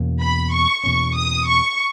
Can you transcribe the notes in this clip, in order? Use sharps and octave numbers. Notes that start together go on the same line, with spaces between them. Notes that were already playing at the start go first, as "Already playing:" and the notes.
Already playing: E2 B2 A#3 C#4
B5
C#6
E2 B2 A#3 C#4 C#6
D#6
C#6